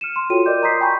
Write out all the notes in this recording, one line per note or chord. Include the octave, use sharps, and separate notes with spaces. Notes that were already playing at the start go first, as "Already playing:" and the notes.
F6 C#7 D#7 E7
C6
F4 F#4 A4 C#5 G5 D#7
A#4 D5 D#5 D6 G6
A#5 C6 D#6 G6 B6 C7
G5 G#5 A#5 B5 C#6 G6